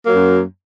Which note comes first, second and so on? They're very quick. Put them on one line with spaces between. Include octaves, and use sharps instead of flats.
A#3 F#3 F#2